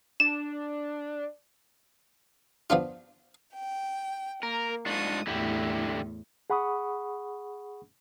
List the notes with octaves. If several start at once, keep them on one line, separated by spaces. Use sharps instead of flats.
D4 E7
F3 B3 D4 F4
G5
A#3 A#4
G#2 D4 F4 C#6 D#6
E2 A2 D3 E4 G4
G#4 F#5 B5 C#6 D#6